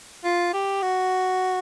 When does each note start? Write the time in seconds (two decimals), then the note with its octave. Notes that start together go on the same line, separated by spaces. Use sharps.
0.24 F4
0.53 G4
0.82 F#4